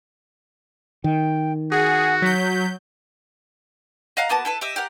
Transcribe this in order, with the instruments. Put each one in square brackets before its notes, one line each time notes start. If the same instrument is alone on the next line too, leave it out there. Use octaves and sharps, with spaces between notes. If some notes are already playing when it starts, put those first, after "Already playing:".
[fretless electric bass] D#3 [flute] G5
[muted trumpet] F#4 [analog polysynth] G#4 [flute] F#5
[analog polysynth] F#3 G6 [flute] B6
[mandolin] D#5 F5 F#5 A#5
A#3 B3 F#4 A5
E4 A4 B4
G4 D#5 E5
G4 A#4 F#5